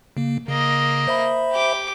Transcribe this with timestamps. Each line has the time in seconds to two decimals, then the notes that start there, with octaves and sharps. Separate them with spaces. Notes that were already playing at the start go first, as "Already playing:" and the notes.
0.17 C#3 A#3
0.48 C#3 A#3 D#5
1.07 C5 E5 B5
1.52 G4 D6